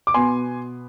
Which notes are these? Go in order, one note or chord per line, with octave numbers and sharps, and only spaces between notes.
D6
B2 B3 G#5 C6